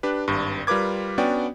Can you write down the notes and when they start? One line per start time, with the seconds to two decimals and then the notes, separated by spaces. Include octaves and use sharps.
0.03 D4 G4 B4
0.28 G#1 G2
0.67 G3 F4 A#4 B4 D6 G#6
1.18 B3 C#4 D4 F#4 D5 G5